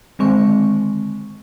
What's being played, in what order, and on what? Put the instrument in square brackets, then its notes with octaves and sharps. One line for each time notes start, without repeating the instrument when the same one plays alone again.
[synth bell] D3 D#3 G#3 C4 C#6